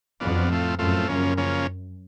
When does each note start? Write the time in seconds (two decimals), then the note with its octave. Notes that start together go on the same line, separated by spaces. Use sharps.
0.20 F2 F#3 B3 D4 F4
0.49 A2 F3 A3 C4 F4
0.79 F#2 A2 F3 A3 C4 F4
1.08 F#2 C#3 F3 A#3 C#4
1.37 C#3 F3 A#3 C#4